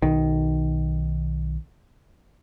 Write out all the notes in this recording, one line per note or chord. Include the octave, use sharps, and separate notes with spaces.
B1 D#3